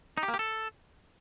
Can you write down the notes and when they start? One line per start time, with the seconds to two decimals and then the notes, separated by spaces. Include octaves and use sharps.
0.18 D#4
0.23 G4
0.28 A#3
0.34 G4
0.39 A4